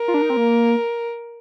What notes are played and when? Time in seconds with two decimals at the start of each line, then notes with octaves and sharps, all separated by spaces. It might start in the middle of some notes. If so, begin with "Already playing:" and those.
Already playing: A#4
0.08 F4
0.14 D4
0.22 D#4
0.30 C4
0.37 A#3